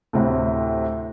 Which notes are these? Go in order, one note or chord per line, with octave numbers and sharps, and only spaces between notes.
D2 A2 C3